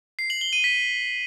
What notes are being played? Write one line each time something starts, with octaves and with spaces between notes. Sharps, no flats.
C7
F#7
G7
D#7
B6